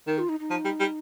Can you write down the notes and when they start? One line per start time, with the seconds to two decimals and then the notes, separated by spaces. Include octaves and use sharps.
0.07 D#3 A#4
0.18 F4
0.29 D#4
0.40 D#4
0.51 F3
0.65 G3
0.80 G3